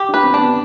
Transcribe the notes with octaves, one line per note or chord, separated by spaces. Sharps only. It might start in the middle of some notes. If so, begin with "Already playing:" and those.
Already playing: G4
D4
B4
C4
B3 D4